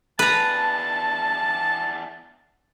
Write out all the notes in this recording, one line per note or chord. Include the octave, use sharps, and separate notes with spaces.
E2 D4 B4 A5 A#5